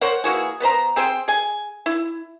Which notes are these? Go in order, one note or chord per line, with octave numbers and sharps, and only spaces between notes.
A#4 C5 C#5 F#5
E3 A#3 F#4 G#4
B3 B4 C5 A#5
C4 G#4 C5 G5
G#4 G#5
E4